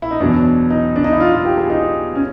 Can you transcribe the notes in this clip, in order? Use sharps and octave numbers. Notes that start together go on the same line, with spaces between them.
E4
D#4
E2 B2 F#3 D4
D#4
D4
D#4
E4
F4
F4
G4
G#4
D#4
C#4